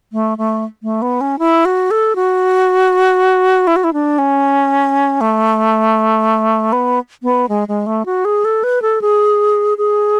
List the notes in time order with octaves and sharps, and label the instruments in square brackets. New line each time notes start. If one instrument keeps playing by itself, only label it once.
[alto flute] A3
A3
A3
B3
C#4
E4
F#4
A4
F#4
E4
F#4
E4
D4
C#4
A3
B3
B3
G#3
G#3
A3
F#4
G#4
A4
B4
A4
G#4
G#4